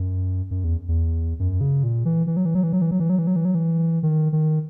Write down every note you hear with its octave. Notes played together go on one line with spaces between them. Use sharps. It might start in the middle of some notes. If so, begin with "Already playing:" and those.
Already playing: F#2
F#2
E2
E2
F#2
C#3
A#2
E3
E3
F#3
E3
F#3
E3
F#3
E3
F#3
E3
F#3
E3
F#3
E3
F#3
E3
D#3
D#3